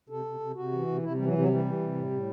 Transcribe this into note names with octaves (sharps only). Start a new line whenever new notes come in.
C3 A4
C3
C3
C3 F#4
E3
C3
C3 E4
E3 G3
F#3
C3
F#3
E3 G3
E3
C3
A2
A2